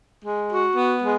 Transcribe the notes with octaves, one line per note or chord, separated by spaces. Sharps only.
G#3
F#4
B3
G#3